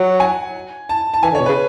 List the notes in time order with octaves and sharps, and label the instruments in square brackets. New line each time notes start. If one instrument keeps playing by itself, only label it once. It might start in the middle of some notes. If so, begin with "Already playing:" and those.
Already playing: [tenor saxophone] F#3 [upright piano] F#5
[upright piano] G#5
A5
A5
[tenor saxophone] E3 [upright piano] G#5
[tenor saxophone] D3
[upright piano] C#5
[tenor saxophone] B2
[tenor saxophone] C#3 [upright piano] B4